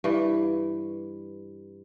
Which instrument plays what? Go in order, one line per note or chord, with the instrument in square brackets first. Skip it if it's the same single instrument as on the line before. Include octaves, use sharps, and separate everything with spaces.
[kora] G2 E3